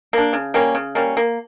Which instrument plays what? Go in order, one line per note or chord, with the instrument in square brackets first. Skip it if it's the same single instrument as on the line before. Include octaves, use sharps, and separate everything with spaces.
[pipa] A#3 D4
C#3
G3 A#3 C#4
C#3
G3 A#3 C#4
A#3